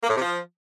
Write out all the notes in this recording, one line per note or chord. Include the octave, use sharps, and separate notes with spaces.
A#3
A2
C3
F3